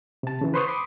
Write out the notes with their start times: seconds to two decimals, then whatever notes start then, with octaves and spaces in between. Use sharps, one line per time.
0.23 C3 A5
0.41 C#3 E3
0.54 B4 C5 C6 C#6 D#6
0.67 B5 C6 D6 D#6